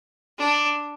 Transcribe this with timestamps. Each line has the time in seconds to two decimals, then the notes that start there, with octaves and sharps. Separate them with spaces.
0.38 D4